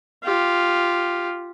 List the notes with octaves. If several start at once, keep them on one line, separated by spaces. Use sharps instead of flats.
F4 G4